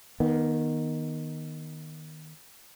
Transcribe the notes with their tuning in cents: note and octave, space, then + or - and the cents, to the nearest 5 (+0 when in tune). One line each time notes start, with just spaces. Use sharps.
D#3 +0 B3 -25